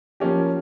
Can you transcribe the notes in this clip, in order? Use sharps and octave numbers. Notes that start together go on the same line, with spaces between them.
F3 A#3 C#4 G4